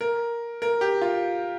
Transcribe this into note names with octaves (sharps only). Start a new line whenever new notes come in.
A#4
A#4
G4
F4